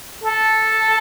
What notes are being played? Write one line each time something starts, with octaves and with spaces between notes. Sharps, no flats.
A4